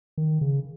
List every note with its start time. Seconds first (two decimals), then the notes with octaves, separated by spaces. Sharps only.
0.18 D#3
0.41 C#3